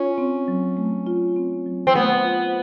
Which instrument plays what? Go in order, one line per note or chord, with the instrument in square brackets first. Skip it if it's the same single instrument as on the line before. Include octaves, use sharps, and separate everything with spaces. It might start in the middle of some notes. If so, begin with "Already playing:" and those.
Already playing: [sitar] C#4 [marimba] F4
[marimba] C4
F#3
A3
F4
C4
F#3
[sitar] C4
[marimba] A3 [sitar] B3
[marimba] F4